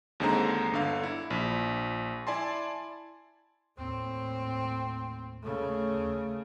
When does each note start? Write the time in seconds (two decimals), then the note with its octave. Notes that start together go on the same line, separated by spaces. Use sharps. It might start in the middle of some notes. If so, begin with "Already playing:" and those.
0.20 D#2 D3 G#3 C4 C5 A#5
0.72 G1 D3 F5
1.03 E4
1.30 A#1
2.27 E4 D5 G#5 A5 C6
3.78 D#2 A2 C4
5.44 C#3 A3